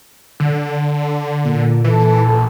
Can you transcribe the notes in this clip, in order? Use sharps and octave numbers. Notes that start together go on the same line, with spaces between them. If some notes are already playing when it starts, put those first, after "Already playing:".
D3
A#2
A#2 E3 A4
A#1